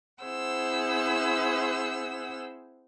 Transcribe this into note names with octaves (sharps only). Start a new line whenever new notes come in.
C4 E4 G#4 C5 F#5 E6